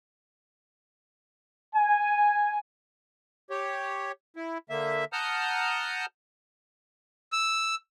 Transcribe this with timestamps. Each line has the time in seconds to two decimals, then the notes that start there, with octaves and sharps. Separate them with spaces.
1.75 G#5
3.50 G4 C#5
4.36 E4
4.70 D3 A#3 E5
5.13 F#5 A5 A#5 D#6 F6 G6
7.32 E6